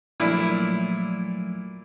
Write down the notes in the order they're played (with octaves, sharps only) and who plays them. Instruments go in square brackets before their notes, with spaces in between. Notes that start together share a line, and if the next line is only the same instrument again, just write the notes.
[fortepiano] A#2 D4 E4 [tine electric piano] F3 F#3 A3